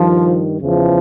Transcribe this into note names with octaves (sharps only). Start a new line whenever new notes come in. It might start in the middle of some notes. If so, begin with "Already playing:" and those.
Already playing: G2 D#3 F3
E2 C#3 E3 F3